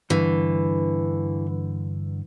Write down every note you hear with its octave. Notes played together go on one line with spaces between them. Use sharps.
G2 D3 E3